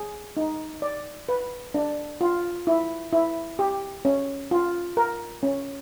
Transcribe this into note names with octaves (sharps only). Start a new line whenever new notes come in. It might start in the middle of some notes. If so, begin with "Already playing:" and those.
Already playing: G#4
D#4
D5
B4
D4
F4
E4
E4
G4
C#4
F4
A#4
C#4